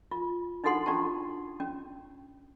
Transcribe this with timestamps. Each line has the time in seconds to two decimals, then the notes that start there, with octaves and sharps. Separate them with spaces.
0.11 F4
0.64 D4 D#4 F#4 A4 F#5 C6
0.86 C#4 D4 F4 G4 A5
1.60 C#4